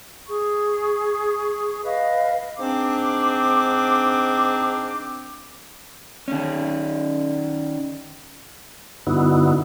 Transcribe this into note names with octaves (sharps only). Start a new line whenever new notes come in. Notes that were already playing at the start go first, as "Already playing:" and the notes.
G#4 C#6
B4 D#5 F5
G#2 C4 D4 D6
D#3 C#4
G2 D3 B3 D#4 E4 F#4